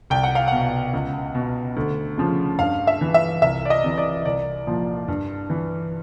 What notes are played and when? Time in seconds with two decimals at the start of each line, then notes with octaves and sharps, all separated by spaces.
0.10 C2 G5
0.23 F#5
0.35 F5
0.48 B2 F#5
0.94 C#2
1.35 B2
1.76 D2
2.18 C#3 F3
2.59 G2 F5
2.87 E5
3.01 E3
3.14 E5
3.42 C2 E5
3.65 D5
3.70 D#5
3.84 C3 E3
3.98 D5
4.25 C2 D5
4.67 A#2 F3
5.08 G2
5.50 E3